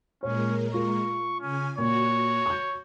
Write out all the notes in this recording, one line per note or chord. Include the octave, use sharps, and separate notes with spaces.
A#2 G#3 C#4 A#4 C#5
F4 C#6
C#3 C#4 G#5
A#2 F#4 C#5
C#6 G6